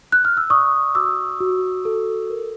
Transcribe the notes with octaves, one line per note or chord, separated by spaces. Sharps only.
F#6
F6
E6
D5 C#6 D#6
F#4 D6 E6
F#4
A4
A#4